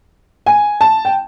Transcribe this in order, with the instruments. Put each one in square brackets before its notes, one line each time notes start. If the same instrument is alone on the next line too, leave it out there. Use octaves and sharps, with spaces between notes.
[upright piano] G#5
A5
G5